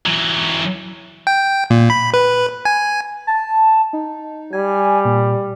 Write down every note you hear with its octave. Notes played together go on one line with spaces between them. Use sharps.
E3 F#3
G5
A#2
B5
B4
G#5
A5
D#4
G3 G#5
A#2